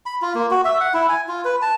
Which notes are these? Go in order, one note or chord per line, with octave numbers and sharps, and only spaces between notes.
B5
F4
A#3
F#4
E5
F#5
E4
G#5
F4
B4
A5